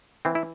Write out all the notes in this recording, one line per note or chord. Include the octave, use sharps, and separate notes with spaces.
E3 C4
E4